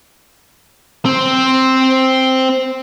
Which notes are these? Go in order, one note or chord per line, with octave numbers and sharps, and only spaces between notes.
C4 C5